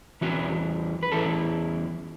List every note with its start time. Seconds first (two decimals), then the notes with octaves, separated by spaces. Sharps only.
0.21 E2 E3 C#4 F#4
1.03 B4
1.12 E2 E3 C#4 E4 A4